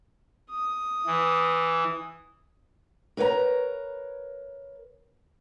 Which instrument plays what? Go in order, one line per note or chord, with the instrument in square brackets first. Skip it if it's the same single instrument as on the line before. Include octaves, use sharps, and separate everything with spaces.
[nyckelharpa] D#6
[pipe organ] E3
[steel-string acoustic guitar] A#4 B4 C#5 F#5 A#5